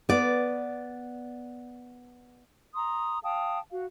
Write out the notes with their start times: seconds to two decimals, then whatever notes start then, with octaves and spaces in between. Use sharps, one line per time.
0.09 B3 D5
2.75 A#5 C6 D#6
3.24 F5 G5 A5 D#6
3.70 F#4 F5